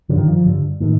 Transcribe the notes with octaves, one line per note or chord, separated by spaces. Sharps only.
D3 F3
G2 D#3
F3
G2 D3
A2 D#3